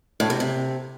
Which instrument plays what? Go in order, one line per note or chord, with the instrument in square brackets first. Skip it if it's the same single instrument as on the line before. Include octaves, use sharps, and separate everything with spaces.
[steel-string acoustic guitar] A2
C3
C3